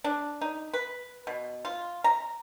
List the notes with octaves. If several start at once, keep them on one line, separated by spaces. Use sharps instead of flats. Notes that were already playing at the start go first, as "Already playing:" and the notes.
D4
D#4
B4
B2
F4
A#5